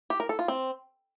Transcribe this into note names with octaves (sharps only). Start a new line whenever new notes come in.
G4
A#4
A4
F4
C4